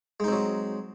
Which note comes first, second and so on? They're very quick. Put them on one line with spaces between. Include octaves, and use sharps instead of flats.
G#3 D#4 C4 F#3